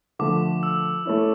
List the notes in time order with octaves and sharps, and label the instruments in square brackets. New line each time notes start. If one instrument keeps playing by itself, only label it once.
[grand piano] D3 F3 A3 [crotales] D6
[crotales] E6
[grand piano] A3 C#4 E4